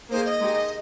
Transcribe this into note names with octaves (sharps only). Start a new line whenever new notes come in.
A#3 D#4 G#4 C5
D#5
G#3 D#4 G4